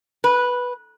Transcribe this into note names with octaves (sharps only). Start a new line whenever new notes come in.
B4